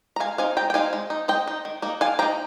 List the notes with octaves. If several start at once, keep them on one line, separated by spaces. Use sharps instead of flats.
A#5
G#3 F5 G#5
C4 D#4 F5 G#5
G#3 G5 A#5
G5
C4 D#4 F5 G#5
G#3
D#4
G#3 D#5 G5
D#4
D#3
A#3 D#4
D#3 F5 G#5
A#3 D#4 G5 A#5